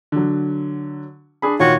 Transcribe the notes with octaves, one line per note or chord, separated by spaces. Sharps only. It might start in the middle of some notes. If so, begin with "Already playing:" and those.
D3 F#3
D4 G#4 B5
A#2 D#3 F4 F#4 C#5